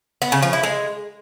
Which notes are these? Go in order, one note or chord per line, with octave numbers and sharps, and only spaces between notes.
B3
C#3
F3
E4
G#3